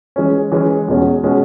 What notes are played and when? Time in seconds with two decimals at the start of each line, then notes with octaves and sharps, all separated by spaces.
0.16 E3 G#3 C#4
0.52 E3 G#3 C#4
0.88 E2 B2 G#3 C#4
1.24 B2 G#3 C#4